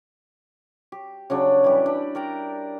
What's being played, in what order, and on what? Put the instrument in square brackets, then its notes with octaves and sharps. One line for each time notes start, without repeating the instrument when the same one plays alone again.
[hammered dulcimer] G4
C#3 F#3 D4
E3 G3 E4 G4
D4
A#4 D5 G5 A#5